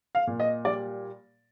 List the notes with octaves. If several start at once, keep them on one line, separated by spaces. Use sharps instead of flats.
F5
A#2
D#5
G3 D5